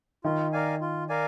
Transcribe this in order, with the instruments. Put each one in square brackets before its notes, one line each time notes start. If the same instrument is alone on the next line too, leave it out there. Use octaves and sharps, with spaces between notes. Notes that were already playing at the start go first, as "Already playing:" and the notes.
[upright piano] D#3 [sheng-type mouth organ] F4
[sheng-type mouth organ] A#4 D5 F5 G#5
F4
A#4 D5 F5 G#5